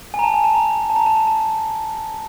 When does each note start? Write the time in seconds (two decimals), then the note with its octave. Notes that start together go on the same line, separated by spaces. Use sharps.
0.14 G#5
0.19 A#5
0.24 A5
0.34 G#5
0.44 A5
0.55 A#5
0.90 A5
0.96 A#5
1.06 A5
1.17 A5
1.27 A5